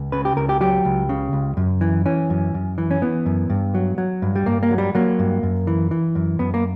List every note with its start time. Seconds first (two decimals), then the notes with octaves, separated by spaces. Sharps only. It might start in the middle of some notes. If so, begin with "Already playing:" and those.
Already playing: C#2
0.12 C#3 B4
0.25 G4
0.37 C#2 A#4
0.49 G4
0.61 F#3 G4
0.85 C#2
1.09 C#3
1.33 C#2
1.57 F#2
1.81 E3
2.06 E3 C#4
2.30 F#2
2.54 F#2
2.78 E3
2.91 C#4
3.02 E3 B3
3.26 F#2
3.50 G2
3.75 F#3
3.98 F#3
4.22 G2
4.36 G3
4.46 G2 A#3
4.63 A#3
4.71 F#3
4.78 G3
4.95 F#3 A#3
5.19 G2
5.43 F#2
5.67 E3
5.91 E3
6.15 F#2
6.39 F#2 B3
6.54 A#3